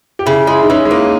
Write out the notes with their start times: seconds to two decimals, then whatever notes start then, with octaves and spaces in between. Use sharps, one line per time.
0.19 G4
0.26 C#3 E4
0.47 G#3 E4
0.63 D#4
0.70 E3 C#4
0.85 G#3
0.91 A#3 D#4